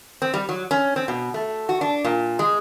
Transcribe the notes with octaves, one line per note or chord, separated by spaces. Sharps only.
C4
G3
F#3
C#4
C4
B2
A3
F#4
D4
A#2
G#3